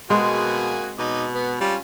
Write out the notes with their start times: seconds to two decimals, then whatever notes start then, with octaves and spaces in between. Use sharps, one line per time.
0.10 B2 G#3 A#3 C4 F#4 G#4
0.99 B2 D#4 D#5 D6
1.35 B3
1.61 G3 C#4 F4